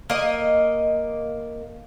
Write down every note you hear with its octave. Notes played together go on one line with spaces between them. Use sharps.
A#3 D#5